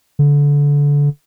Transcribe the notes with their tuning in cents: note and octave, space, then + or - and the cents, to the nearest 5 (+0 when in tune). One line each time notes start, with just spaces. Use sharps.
D3 -25